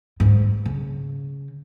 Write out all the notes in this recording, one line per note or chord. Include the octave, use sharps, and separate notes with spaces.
G#2
C#3